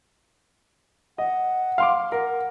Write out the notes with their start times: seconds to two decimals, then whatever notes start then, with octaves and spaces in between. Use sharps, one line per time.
1.18 D#5 F#5
1.78 F5 C6 D6
2.12 A#4 F#5